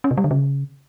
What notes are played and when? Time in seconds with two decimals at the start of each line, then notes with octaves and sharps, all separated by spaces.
0.04 C#4
0.11 C3
0.18 G3
0.24 D3
0.31 C#3